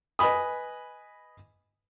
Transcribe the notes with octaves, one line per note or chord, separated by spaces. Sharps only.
B4 D#5 G#5 B5 D#6